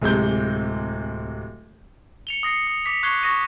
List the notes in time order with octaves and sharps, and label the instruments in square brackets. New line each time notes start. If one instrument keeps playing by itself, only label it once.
[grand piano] D1 C3 G#3 G6
[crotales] C#7 F7 G7
D#6 A#6 C7 C#7
D#6
D6 B6 C#7
C#6 F#6 G#6 C7 G7
C#6 D#6 A#6 D#7